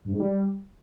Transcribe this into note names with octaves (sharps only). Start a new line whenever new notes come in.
G2
G#2
G3